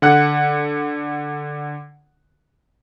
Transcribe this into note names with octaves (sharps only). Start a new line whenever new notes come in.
D3 F#5 F#6